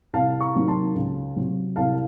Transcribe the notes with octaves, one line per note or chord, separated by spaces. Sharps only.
C2 F5 A5
A#5 C#6
C3 D#3 F#3 A#3
A5 C6
C#2
C3 F#3
C2 F5 A5